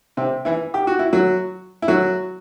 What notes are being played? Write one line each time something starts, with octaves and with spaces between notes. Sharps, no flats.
C3 C4
E3 E4
G4
F#4
E4
F#3 F#4
E4
F#3 F#4